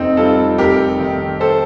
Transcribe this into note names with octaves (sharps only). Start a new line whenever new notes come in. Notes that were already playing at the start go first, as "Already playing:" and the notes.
Already playing: F1 C4 D#4
G3 F4 A4
F1 G4 A#4
D#3
A4 C5